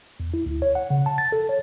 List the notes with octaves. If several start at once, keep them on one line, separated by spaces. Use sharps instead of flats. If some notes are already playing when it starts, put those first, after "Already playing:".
E2
E4
D2
C#5
F#5
C#3
A5
A6
A4
C#5